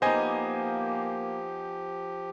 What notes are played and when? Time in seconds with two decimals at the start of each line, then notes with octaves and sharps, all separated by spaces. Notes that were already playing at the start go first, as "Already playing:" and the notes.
0.02 F3 A#3 B3 D#4 G4 C5 D#5 G#5